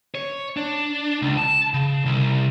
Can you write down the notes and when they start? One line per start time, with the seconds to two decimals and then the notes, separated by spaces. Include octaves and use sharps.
0.15 C#5
0.57 D4
1.22 C#2
1.37 A5
1.74 C#3
2.06 C2